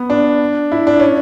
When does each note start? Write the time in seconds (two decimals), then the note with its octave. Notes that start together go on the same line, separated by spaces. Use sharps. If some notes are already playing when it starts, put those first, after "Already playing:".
Already playing: B3
0.10 D4
0.72 E4
0.87 D4
1.00 C#4